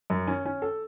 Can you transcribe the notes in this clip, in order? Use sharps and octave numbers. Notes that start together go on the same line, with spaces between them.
F#2
C#4
C#4
A4